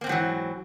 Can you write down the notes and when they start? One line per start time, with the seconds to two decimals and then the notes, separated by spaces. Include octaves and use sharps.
0.01 A#3
0.04 C4
0.07 G#2
0.09 F#3
0.12 E3